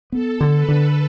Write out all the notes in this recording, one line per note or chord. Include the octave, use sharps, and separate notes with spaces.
B3 A4
D3
B4
D3